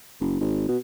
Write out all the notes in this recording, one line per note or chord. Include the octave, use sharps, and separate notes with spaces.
F#1
G#1
B2